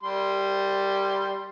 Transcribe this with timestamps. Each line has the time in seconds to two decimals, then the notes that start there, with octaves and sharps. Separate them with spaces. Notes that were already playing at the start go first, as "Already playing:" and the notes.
0.03 G3 C6